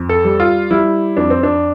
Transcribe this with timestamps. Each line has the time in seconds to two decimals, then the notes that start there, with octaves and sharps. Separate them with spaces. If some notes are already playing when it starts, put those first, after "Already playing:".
Already playing: F2
0.09 A4
0.25 G3
0.40 F4
0.70 G3 E4
1.17 F2 D4
1.30 C4
1.43 D4